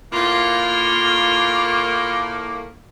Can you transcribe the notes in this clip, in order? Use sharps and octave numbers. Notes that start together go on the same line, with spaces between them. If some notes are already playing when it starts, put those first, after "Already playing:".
A2 A#3 F4